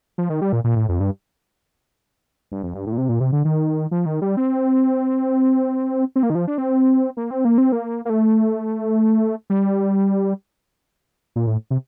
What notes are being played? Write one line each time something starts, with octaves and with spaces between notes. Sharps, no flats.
F3
D#3
G3
A#2
A#2
A2
F2
G2
G2
F2
G2
A2
A#2
C3
A#2
C3
D3
D#3
F3
D#3
G3
C4
C4
A#3
D#3
F3
D4
C4
A#3
C4
A#3
C4
A#3
A#3
A3
G3
A#2
A2
C3